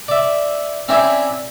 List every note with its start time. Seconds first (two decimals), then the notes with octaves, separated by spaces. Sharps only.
0.08 D5 E5
0.88 C4 C#4 E4 C5 D5 E5